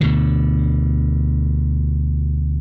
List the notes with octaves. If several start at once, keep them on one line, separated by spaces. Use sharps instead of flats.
D2 B2 D3